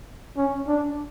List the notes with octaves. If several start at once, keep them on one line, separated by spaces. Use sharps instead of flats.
C#4
D4